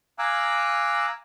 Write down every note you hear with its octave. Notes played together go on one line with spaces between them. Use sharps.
F5 G#5 A#5 D6 E6 F#6